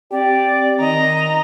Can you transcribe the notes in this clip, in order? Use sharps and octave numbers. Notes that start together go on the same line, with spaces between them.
C4 G4 D5
D#3 D#5 A#5